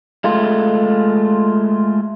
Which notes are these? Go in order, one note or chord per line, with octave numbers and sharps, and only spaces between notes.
G#3 A3 F4